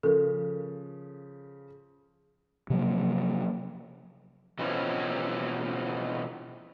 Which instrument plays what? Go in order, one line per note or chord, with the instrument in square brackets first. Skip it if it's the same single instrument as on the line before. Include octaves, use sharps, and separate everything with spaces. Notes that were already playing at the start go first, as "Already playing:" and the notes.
[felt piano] C#3 F3 [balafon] A4 A#4
[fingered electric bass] C3 F3 F#3 A#3
[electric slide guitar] B2 E3 F3 C4 C#4 E4